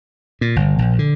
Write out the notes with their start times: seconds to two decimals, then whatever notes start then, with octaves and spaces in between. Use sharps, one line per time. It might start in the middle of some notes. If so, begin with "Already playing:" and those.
0.41 A#2
0.56 G1
0.79 A#1
0.99 D3